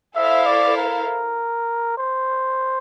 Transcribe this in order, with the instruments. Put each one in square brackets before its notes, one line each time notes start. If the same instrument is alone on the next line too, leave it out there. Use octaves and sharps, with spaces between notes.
[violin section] E4 A4 C5 F5 [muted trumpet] E5
[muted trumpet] D5
A#4
C5